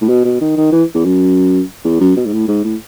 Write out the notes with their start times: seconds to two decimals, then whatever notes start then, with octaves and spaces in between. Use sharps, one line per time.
0.01 A2
0.09 B2
0.25 B2
0.41 D#3
0.57 D#3
0.72 E3
0.95 E2
1.05 F#2
1.84 E2
2.00 F#2
2.17 B2
2.26 G#2
2.33 A2
2.48 G#2
2.64 A2